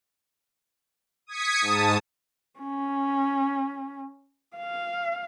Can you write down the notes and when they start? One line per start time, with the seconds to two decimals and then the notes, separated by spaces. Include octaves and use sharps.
1.27 D#6 G#6 B6 C#7
1.61 G#2 A5 D#6
2.59 C#4
4.57 F5